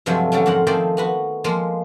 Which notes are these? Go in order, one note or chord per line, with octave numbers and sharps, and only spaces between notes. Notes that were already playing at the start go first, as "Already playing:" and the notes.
G2 C3 F3 F#3 G#3 A3
D3 F#3 G3 C#4
F2 G#2 A#4 F#5
D#3 F3 A3 C4 G#4 D5
B3 F#4 B4
F3 G#3 A#3